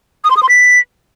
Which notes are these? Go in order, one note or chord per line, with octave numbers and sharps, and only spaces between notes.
D#6
C6
D#6
C6
B6